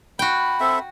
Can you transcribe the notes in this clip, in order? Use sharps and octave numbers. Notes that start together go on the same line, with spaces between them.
F#4 G5 B5
C4 A4 E5